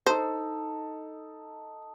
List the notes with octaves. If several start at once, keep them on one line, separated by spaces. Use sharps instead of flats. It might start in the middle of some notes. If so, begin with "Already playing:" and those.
D#4 A4 C5